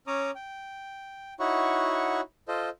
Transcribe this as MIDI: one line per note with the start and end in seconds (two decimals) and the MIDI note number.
0.07 0.31 61
0.07 0.31 73
0.07 0.31 82
0.07 0.31 86
0.07 0.31 87
0.35 1.34 79
1.40 2.21 63
1.40 2.21 64
1.40 2.21 66
1.40 2.21 73
1.40 2.21 78
1.40 2.21 85
2.48 2.69 65
2.48 2.69 69
2.48 2.69 72
2.48 2.69 75